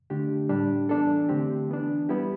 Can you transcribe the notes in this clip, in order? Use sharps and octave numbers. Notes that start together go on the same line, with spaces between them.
D3 A3 D4 G4
A2 G3 D4 G4
E3 B3 D4 A4
D3 A3 C4 G4
E3 B3 D4
G3 B3 E4 G4